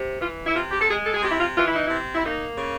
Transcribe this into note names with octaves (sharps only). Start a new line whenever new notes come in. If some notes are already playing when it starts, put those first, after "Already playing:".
Already playing: C3
E3 F4
E4
C3 F4
G4
A4
G#3 G#4
A4
G#4
C3 G4
E4
F4
E3 F4
E4
D#4
E4
C3
E4
A#3 D#4
C#3